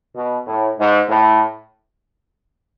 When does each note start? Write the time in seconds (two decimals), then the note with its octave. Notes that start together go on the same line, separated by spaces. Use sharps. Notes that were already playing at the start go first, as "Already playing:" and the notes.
0.15 B2
0.47 A2
0.78 G#2
1.09 A2